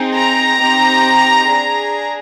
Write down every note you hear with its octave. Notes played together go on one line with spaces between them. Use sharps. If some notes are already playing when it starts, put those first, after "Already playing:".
Already playing: C4 D#4 G#4
A#5
C4 D#4 G4
D4 G#4